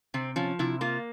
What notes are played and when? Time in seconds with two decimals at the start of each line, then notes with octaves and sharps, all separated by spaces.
0.14 C3 C4
0.36 F3 C#4
0.59 C3 E4
0.81 A#3 F4